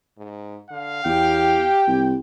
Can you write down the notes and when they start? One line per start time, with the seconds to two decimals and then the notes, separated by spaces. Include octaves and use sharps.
0.18 G#2
0.71 D3 F5
1.05 E2 G4 G5
1.88 C2